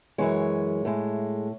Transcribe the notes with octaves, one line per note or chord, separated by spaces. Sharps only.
F#2 E3 G#3 C#5
A2 G#3